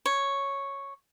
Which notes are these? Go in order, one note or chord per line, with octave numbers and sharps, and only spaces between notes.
C#5